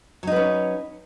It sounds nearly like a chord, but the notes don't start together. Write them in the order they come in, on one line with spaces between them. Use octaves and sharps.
F#3 D#4 B4 C#4